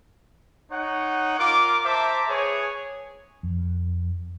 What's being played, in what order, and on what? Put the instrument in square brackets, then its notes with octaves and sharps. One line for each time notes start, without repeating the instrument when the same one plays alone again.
[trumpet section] D#4 C#5 F#5
F4 A#4 D6
C5 E5 A5 A#5 D6
G#4 B4 C#5
[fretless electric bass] F2